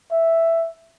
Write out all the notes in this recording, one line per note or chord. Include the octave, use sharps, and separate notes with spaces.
E5